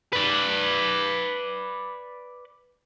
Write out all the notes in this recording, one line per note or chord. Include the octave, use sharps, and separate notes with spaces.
B4 D5